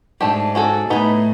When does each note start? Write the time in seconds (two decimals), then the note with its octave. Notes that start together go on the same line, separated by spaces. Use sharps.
0.21 G#2 A3 D4 G4
0.55 C#4 F#4 A4
0.90 A2 B3 D#4 G#4 B4